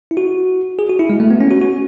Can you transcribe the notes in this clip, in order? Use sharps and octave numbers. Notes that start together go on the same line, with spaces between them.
E4
F#4
G#4
F#4
E4
G#3
A3
B3
C#4
F#4
F#4